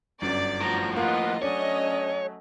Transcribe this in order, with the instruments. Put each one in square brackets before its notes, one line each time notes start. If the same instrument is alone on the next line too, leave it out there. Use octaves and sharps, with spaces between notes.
[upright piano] G1 F#2 [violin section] D5
[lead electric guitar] A2 F3 [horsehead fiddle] F#4 A#5
[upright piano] A#3 [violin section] F4 D#5 [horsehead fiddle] B4 F#5
[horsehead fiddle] F#3 A3 [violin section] C#4 D#5 [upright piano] D4 [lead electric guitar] C#5